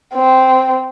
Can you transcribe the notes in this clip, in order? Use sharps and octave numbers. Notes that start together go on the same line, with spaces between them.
C4